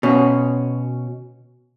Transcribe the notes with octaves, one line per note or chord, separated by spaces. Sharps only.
B2 C#4